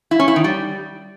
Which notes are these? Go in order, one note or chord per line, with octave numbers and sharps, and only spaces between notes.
E4
C#4
E4
D#3
G3